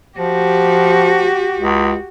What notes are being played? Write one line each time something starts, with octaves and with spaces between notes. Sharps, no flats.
F3 F#4 G4
C#2